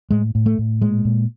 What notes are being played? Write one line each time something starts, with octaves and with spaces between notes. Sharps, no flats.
A2 G#3
A2
A3
A2
A#2 G#3
A#2